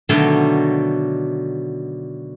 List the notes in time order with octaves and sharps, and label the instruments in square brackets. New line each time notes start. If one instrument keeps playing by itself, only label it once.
[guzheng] B2 D3 D#3 F#3 A3